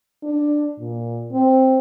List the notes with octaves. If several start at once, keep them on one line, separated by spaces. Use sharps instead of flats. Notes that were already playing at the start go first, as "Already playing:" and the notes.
D4
A#2
C4